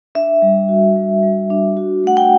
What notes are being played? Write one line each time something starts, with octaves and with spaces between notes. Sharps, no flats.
D4 E5
G3
F#4
G3
G3
D4
F#4
A3 F#5
G5